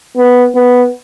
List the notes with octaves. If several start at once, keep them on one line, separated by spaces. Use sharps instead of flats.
B3
B3